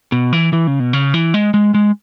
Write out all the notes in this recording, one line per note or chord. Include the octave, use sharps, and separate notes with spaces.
B2
E3
E3
C#3
B2
C#3
E3
G#3
G#3
G#3